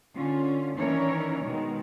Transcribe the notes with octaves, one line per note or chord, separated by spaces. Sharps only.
D3 C#4 F4
D#3 E3 C#4 D4 A#4 C#5
B2 D#3 G#3